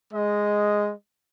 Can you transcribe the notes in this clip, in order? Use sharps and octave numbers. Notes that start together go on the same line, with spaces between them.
G#3 D#5